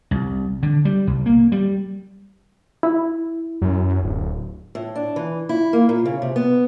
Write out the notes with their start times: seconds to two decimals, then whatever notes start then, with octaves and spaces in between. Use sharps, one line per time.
0.11 C2
0.63 D3
0.85 G3
1.07 C2
1.26 A#3
1.52 G3
2.83 E4
3.62 F#2
4.03 D1
4.75 A2
4.95 D4
5.16 E3
5.49 E4
5.73 A#3
5.89 A#2
6.06 C#3
6.22 C3
6.36 B3